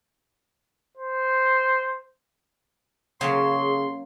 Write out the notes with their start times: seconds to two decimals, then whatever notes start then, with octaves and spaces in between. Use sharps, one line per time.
0.98 C5
3.21 C#3 F#3 A#3 C#4 G#4 C6